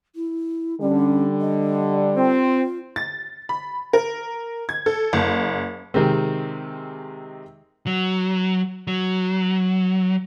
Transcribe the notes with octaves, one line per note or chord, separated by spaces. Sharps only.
E4
D3 G3 C#4
D#5
C4 F4
A6
B5
A#4
G#6
A4
F#1
C3 D#3 G#3 C4
F#3
F#3